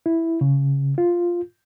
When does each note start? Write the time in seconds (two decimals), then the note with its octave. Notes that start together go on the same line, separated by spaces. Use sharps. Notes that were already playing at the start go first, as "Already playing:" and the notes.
0.06 E4
0.41 C#3
0.98 F4